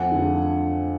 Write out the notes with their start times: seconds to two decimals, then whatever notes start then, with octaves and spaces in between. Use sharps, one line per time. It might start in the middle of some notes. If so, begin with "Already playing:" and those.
Already playing: F2 F#5 G#5
0.12 D3 F3